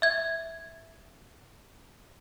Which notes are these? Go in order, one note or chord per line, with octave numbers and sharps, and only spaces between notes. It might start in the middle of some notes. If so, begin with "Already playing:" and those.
E5 G#6